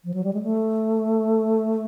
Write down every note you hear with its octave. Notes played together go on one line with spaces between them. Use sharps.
F3
F#3
G3
G#3
A3